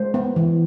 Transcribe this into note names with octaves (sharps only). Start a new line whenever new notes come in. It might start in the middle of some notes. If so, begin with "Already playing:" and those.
Already playing: G#3 C5
B3
E3